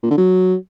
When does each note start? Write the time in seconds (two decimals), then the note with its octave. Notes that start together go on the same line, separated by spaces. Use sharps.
0.03 A#2
0.10 D3
0.18 F#3